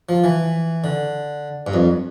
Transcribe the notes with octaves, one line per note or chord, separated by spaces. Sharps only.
F3
E3
D3
G2
F2